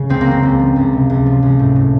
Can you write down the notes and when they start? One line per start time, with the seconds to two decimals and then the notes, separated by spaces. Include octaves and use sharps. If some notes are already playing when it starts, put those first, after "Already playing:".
Already playing: C#3
0.09 C#2 C4
0.21 A#3
0.26 F#3 C4
0.43 C#2
0.60 F3
0.76 C#2
0.93 C3
1.10 C#2
1.26 F3
1.43 C#2
1.59 A2
1.76 A2